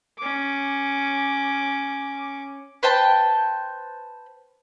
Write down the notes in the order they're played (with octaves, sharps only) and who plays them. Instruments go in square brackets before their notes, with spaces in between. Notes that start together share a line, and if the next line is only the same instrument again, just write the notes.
[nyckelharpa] C#4 D6
[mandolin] B4 C5 G5 A5